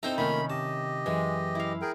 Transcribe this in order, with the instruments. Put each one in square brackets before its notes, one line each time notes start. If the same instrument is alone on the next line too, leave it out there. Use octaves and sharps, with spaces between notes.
[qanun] C4 D#4 A#5 [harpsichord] E4 A4 C5
[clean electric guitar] C3 D#3 D#4 [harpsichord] A3 A#3 F4 [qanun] C#4 [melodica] B5
[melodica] G4 D#5 [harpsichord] A5
[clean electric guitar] F#2 [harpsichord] E3 [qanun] G#3
[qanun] E4 F5
[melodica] G#4 A#4 G5